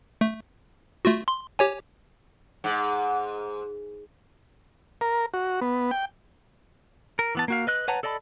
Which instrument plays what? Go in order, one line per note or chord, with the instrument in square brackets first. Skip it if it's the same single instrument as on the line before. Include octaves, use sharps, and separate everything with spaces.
[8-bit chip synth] A3
A3 F4 F#4
C6
G4 C#5 G#5
[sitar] G#2
[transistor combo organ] A#4
F#4
B3
G5
[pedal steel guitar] A#4
E3 B3 A5
A#3 F#4 F5
B4 D#5 F#6
B4 C#5 F#5 A5 A#5
A4 D5 D#5 A5 B5